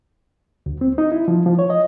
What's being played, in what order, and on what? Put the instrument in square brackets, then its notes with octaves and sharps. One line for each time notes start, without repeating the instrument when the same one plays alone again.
[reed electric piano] D2
C4
D#4
E4
F3
F3
C#5
D#5